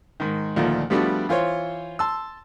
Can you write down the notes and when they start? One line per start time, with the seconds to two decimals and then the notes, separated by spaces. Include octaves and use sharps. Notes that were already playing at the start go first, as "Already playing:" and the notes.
0.20 G#2 D#3
0.56 D2 A#2 D#3 F3 A3
0.90 F3 G3 A3 B3 D4 F#4
1.29 E3 F4 C5 C#5
1.99 A5 C6 E6